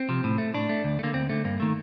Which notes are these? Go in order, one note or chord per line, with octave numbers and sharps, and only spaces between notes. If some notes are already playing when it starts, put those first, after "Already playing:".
Already playing: C4
C3 F3
A2
A3
A2 D4
A3
D2
A3
D3 A#3
D2 C4
D3 A3
G2 A#3
D#3 A3